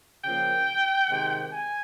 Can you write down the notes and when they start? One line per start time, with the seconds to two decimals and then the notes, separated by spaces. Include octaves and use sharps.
0.24 C#3 F3 A#3 G5
1.10 C3 D#3 G#3
1.53 G#5